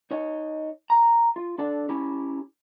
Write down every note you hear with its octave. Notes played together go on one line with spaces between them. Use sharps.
D#4 C#5 D#5
A#5
F4
D4 A4 D5
C#4 E4 G4